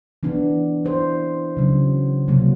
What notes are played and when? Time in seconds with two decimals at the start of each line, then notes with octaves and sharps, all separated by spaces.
0.23 E3 B3 D4
0.84 B3 E4 C5
1.57 C#3 F#3
2.28 C3 F#3 A#3